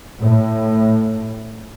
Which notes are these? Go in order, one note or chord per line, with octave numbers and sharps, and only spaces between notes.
A2